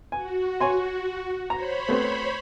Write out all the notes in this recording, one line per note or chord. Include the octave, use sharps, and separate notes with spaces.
F#4 G#5
C#5 G#5 C6
C5 C#5 A#5 B5
A3 B3 C4